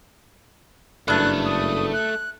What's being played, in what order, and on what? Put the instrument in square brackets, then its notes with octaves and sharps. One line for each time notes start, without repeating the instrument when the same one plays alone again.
[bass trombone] F#1 [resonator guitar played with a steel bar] G2 D4 [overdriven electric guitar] A3 [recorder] F#6
[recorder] D#6
F#6